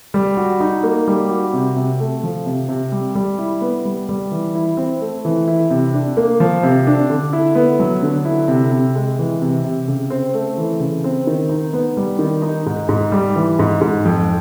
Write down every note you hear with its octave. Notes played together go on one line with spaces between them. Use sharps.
G3
F#4
D#4
A#3
G3
F#4
C3
C3
A3
F3
C3
C3
G3
G3
E4
B3
G3
G3
E3
E4
C4
A3
E3
E4
C3
D4
A#3
F3
C3
D4
D3
E4
B3
F#3
D3
E4
C3
C3
G#3
E3
C3
C3
C#3
C4
A3
E3
C#3
C4
D#3
D#4
B3
G3
D#3
D#4
G#2
G#2
G3
E3
G#2
G#2
F2